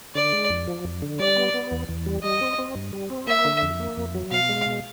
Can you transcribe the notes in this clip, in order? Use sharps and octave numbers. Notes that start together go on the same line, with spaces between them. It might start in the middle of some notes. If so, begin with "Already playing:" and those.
D3 D5
G#3
F2
F3
F2
D3
G3 D5
B3
B3
E2
E2
G3
G3 D#5
C4
C4
G2
G3
C4
A#3 E5
D3
F2
A#3
F2
F#3
B2 F5
G#3
B2